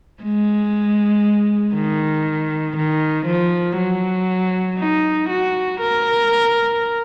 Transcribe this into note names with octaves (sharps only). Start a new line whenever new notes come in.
G#3
D#3
D#3
F3
F#3
D#4
F#4
A#4